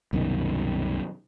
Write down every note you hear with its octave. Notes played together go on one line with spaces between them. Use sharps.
C2 F#2 B2 D#3